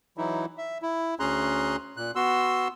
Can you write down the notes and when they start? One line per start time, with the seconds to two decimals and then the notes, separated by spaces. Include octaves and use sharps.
0.18 E3 F#3 D#4 E4
0.58 E5
0.82 E4
1.20 D2 C#4 G#4 A#5 C6 F#6
1.97 A#2 F#6
2.15 B3 F#4 C6 E6